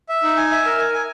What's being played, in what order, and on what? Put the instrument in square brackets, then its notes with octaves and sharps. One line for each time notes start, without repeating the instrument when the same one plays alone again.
[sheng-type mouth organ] E5
D#4
G#5
E5
A#4
G#5
G#5